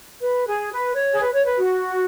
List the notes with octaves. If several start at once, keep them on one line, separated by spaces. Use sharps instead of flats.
B4
G#4
B4
C#5
G#4
B4
C#5
B4
F#4